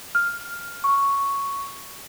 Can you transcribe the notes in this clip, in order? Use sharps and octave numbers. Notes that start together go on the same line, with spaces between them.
F6
C#6